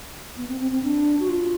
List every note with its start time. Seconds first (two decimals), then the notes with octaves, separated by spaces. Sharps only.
0.37 B3
0.49 C4
0.60 C4
0.72 C4
0.83 D4
1.20 F#4
1.29 F4